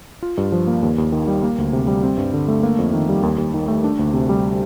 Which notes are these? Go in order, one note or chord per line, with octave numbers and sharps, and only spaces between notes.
F4
G2
F3
A#3
D#2
D#2
D#3
G3
A#3
D2
C3
G3
C4
G2
D3
A3
A#3
F2
D#3
G3
D#2
D#2
D#3
A3
D4
D2
C3
G3